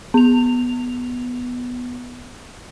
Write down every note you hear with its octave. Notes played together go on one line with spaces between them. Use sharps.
B3 F7